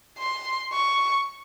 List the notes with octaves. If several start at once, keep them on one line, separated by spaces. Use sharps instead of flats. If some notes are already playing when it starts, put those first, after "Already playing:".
C6
C#6